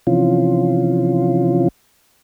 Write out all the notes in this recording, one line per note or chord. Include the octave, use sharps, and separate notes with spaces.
C3 E3 F3 C#4 F4